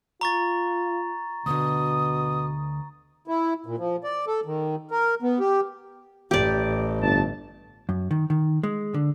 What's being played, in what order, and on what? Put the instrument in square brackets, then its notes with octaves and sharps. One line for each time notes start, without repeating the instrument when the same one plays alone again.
[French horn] F4 [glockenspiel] A#5 C#6 A6
[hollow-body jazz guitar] D2 D3 [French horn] B2 [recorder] D#6
[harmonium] E4
A#2
F3
D5
A4
D#3
A#4
B3
G4
[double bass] A1 [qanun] G4 D5
[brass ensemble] G1 A5
[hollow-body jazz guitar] F#2
D#3
D#3
G#3
D3